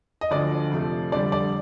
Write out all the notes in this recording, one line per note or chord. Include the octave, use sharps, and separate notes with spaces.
D#5
D2 D3 F3 D5
F2 C3 F3 A3
F2 D3 G3 D5
D5